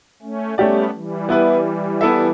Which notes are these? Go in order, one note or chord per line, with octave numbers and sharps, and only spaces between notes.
A3 C#4
G3 A3 B3 C#4 G4 D5
E3 G3
B3 E4 B4
B3 E4 A4 E5